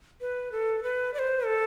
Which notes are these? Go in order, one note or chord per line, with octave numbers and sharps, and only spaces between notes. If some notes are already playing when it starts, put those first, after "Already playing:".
B4
A4
B4
D5
C5
A4